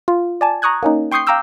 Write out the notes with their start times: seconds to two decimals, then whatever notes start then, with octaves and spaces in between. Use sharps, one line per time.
0.08 F4
0.41 D5 G#5 A5
0.62 A#5 C#6 D#6 F#6 G#6
0.83 A#3 C#4 D#4
1.11 G5 C6 C#6 D#6 G6 C7
1.27 F5 G5 A#5 D6 E6 G6